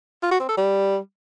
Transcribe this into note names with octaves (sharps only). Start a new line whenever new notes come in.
F4
F#4
C4
A4
G3